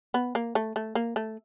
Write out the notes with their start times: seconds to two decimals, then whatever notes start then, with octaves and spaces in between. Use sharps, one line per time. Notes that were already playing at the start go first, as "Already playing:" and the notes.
0.14 B3
0.35 A#3
0.55 A3
0.76 A3
0.95 A#3
1.16 A3